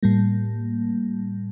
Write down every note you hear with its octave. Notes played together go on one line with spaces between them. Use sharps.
A2 G3 A#3